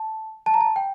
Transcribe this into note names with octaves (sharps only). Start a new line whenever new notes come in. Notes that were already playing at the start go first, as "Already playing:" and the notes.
Already playing: A5
A5
A#5
A5
G5